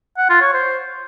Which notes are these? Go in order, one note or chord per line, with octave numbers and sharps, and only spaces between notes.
F#5
F4
C#5
C5